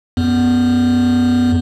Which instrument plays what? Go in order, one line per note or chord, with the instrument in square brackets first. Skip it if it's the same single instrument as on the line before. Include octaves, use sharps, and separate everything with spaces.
[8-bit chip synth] F#2 B3